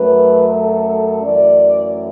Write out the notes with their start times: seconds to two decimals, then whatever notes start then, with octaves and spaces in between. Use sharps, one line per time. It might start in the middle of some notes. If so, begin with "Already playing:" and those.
Already playing: F#2 F#3 A3 B4
0.46 A4
1.23 F#2 E3 A3 D5